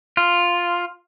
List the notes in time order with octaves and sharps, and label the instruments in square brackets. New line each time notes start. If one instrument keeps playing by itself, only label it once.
[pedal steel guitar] F4